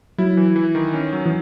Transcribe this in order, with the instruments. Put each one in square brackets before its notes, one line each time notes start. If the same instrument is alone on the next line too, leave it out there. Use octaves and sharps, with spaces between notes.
[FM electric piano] F#3 [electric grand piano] E4
[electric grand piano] E3
E3
D#3
C#4
F#3
[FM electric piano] E3